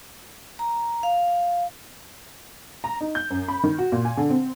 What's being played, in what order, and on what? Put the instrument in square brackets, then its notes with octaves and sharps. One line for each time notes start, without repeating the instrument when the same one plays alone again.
[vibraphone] A#5
F5
[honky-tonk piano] A#5
D#4
G6
F#2
B5
D#3
F#4
A#2
G#5
D3
C4